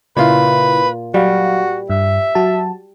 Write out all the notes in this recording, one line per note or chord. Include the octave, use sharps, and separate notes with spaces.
A#2 C#3 E4 F4 B4
F#3 G3 F#4 F5
G2 E5
F#3 F#4 A5